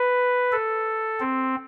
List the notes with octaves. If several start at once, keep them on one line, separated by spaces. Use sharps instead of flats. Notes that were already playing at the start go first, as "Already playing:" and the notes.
Already playing: B4
A4
C4